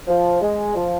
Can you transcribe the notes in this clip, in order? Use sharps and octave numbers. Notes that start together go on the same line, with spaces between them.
F3
G#3
F3